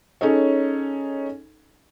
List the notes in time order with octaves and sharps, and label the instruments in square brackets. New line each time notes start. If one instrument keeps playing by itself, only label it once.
[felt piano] C#4 D#4 G#4 A4 C#5